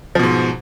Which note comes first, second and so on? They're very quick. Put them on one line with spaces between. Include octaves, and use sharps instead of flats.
F3 B2 G#2